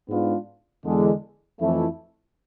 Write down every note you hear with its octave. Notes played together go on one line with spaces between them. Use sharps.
G#2 G#3 B3 D4 F4
E2 D3 G#3
F2 E3 A3 E4